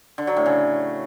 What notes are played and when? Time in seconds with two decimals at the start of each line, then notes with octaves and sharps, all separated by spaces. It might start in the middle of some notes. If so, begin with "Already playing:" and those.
0.18 D3
0.27 F#3
0.36 A2
0.46 C#3